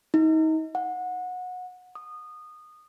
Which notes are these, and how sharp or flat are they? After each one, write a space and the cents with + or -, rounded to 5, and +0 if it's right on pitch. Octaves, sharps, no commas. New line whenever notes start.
D#4 +30
F#5 -25
D#6 -20